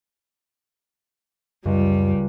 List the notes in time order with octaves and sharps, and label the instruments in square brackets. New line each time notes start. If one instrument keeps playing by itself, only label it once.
[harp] C#2 [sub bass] F#2 [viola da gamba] G3